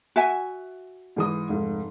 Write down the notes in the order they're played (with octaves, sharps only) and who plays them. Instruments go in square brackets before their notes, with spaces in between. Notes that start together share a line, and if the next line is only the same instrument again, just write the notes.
[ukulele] F#4 E5 G#5
[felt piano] G#2 E3 D#6
F1 G#2